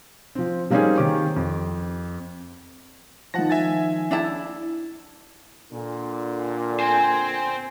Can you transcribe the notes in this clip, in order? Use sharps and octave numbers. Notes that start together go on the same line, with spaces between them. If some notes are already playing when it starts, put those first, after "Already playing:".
F3 C4
G3 A#3 C4 C#4 D#4 G#4
D#3 G4 D6
F2
D#3 F3 F#5 A5 A#6
E5 G#5 A6
D4 E4 A5
A#2 D3
C4 C5 G#5